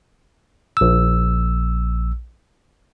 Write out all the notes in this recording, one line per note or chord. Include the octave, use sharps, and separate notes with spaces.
A#1 E6